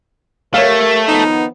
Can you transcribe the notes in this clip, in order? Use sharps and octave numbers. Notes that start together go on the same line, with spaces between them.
A3 G4 A#4 C#5 F5
D#3 F3 B3 D#4